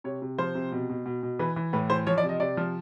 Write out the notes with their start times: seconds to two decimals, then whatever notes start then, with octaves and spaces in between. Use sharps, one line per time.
0.04 C3 C#5
0.22 C3
0.38 F3 C5
0.55 C3
0.72 B2
0.89 B2
1.06 B2
1.23 B2
1.39 E3 B4
1.56 E3
1.73 A2 B4
1.90 E3 C5
2.07 F3 C#5
2.18 D5
2.23 C3
2.29 D#5
2.40 C3 D5
2.57 F3